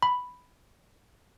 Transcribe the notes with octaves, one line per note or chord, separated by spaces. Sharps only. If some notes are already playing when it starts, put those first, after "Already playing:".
B5